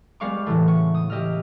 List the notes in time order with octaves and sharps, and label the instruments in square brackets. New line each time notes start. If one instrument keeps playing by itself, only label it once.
[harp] G3 G#3 B3 F5 C#6 D6
A2 C#3 E3 A3
C#6
D#6
G4 D#5 E5 F6